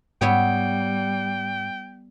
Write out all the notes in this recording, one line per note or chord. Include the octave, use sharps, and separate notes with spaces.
G#2 G3 B3 C#5 E5 G5